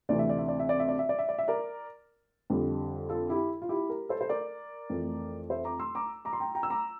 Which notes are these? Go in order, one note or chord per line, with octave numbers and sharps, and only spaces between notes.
D2 C3 E3 A3 D5
E5
D5
E5
D5
E5
D5
E5
D5
E5
D5
E5
D5
E5
A#4 D5
F2 D3 G3
F4 A4
E4 G4
F4
E4 G4
G4 A#4
A4 C5
C5
A#4 D5
F2 E3 A3
C5 E5
A#5 D6
C6 E6
A#5 D6
A#5 D6
C6
G5 A#5
G5 A#5
E6
A#5 D6